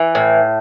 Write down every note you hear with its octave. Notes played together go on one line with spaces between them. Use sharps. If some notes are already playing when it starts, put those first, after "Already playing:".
Already playing: E3
A2